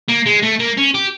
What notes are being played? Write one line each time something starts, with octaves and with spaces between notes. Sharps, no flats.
A#3
G#3
A3
A#3
C#4
G4